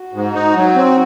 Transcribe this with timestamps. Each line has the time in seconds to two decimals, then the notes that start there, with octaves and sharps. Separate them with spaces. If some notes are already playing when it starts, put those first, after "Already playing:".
Already playing: F#4
0.14 G#2
0.34 D#4
0.56 F#3
0.76 C4